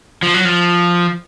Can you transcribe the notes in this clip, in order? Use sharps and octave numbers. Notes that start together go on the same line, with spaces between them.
F3
F#3
F3